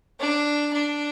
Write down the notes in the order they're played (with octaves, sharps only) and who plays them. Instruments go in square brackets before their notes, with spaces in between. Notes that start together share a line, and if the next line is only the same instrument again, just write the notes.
[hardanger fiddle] D4
D4